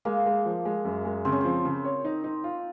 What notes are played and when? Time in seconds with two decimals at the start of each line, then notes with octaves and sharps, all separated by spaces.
0.05 G#3 A#3
0.26 G#3
0.45 F3
0.65 G#3
0.85 F#2
1.05 G#3
1.25 C#3 C4
1.32 C#4
1.41 F3 C4
1.65 C#3
1.84 C#5
2.05 D#4
2.24 D#4
2.44 F4